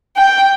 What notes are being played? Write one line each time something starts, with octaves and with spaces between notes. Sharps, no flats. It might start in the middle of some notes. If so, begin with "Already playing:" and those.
G5